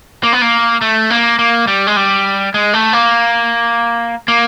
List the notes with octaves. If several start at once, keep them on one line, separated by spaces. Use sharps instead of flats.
A#3
B3
A#3
A3
A#3
A#3
G3
G#3
G3
G#3
A3
A#3
A#3